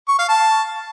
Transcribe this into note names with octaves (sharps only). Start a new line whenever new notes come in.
C#6
F5
A5